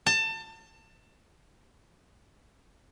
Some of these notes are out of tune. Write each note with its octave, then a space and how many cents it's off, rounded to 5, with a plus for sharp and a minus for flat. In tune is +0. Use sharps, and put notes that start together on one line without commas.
A5 +25